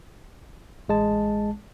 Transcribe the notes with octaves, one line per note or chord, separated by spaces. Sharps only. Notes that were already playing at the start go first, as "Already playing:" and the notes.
A1 G#3 A5